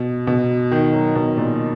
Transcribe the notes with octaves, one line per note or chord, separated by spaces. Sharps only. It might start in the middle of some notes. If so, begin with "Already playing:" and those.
Already playing: B2
B2
D#3
F#3
B2
A#2